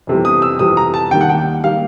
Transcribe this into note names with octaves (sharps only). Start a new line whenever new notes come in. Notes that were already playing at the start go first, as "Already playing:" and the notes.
F2 C3 E3 G3
D#6
E6
F2 C3 E3 G3 D#6
A#5
A5
D#2 D#3 G3 A#3 G5
F#5
G5
D#3 G3 A#3 F5